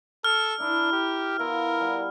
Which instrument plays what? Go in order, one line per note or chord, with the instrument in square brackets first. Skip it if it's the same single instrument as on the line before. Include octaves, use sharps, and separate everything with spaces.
[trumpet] A4 [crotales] F6
[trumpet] D4 [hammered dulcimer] E4 A#4
[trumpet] G4
[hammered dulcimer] B2 E4 F4 [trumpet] A#4
[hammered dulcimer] G3 F#5 G#5